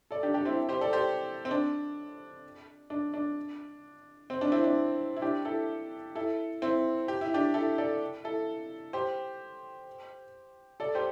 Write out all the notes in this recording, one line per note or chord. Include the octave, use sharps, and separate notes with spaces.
A4 D5
D4 G4
D4 G4
C4 E4
G4 C5
A4 D5
G4 C5
C4
D4
D4
D4
C4
D4
C4 E4
D4
E4
D4 G4
E4 A4
E4 A4
C4 E4
G4
E4
D4 G4
E4 A4
A4 D5
E4 A4
G4 C5
A4 D5
G4 C5